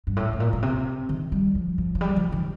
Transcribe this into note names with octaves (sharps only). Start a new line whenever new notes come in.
G2
A2
A2
A#2
A#2
C3
D#3
G3
F3
F3
F3
G3
F3
D#3